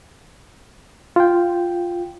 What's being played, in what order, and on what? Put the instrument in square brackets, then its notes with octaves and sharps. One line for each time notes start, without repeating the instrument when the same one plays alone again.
[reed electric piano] F4 G5